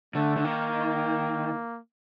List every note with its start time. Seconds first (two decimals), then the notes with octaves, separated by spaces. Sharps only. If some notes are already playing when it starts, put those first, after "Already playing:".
0.15 D3 A3
0.37 D3
0.44 D#3 A#3